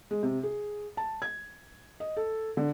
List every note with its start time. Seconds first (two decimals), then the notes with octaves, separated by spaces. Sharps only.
0.11 G#3
0.23 C3
0.43 G#4
0.97 A5
1.22 G#6
2.00 D#5
2.17 A4
2.57 D3